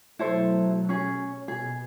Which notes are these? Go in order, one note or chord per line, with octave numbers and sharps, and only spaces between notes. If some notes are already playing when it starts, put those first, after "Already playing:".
B2 F#3 A3 E4 A4 C5
C#4 G#4
B2 G#4